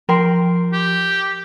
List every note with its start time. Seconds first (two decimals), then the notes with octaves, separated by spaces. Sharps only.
0.09 F3 A#4 G5 C6
0.73 G4